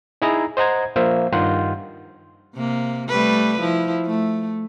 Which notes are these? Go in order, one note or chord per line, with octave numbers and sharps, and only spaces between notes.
D#4 E4 G#4 E5 A#5
C5 D#5 F#5 A#5 G#6
F3 A#3 C5 E5
G2 D#3 F4 F#5 C6 G6
C3 A#3
G3 A3 B4
F3 E4
A3